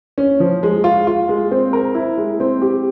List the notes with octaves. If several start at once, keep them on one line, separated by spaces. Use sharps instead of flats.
C#4
F3
G#3
F4
F4
G#3
C4
A#4
E4
G#3
C4
G4